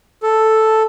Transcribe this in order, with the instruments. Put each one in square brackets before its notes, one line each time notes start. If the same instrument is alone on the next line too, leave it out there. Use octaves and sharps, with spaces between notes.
[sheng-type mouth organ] A4